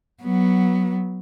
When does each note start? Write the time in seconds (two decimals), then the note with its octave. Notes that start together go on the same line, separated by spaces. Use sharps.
0.23 F#3 B3